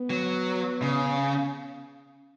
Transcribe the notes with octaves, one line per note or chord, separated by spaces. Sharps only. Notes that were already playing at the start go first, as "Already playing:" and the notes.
Already playing: B3
F#3
C#3
C#4